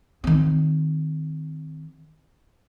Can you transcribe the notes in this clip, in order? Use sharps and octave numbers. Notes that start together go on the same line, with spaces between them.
D#3 C4